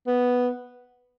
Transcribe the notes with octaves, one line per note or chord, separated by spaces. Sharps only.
B3